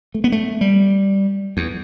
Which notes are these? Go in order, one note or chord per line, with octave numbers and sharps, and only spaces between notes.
A3
B3
A3
G3
E2